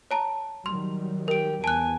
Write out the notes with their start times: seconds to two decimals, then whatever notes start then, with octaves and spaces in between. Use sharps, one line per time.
0.11 C#5 A5 A#5
0.66 D#3 F#3 G3 C6
1.28 G4 A#4 D7
1.64 E2 G#5 A5 F#6